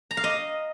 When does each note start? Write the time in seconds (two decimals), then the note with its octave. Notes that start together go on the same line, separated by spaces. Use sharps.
0.11 A#5
0.17 F5
0.24 D#5